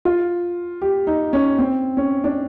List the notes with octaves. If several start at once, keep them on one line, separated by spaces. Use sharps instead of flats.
F4
G4
D#4
C#4
C4
C#4
D4